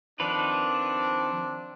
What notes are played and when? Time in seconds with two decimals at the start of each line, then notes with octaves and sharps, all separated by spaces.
0.20 D#3 F3 C4 D4 B4